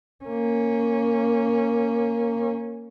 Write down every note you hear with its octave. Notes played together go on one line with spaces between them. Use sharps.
A#3 C#4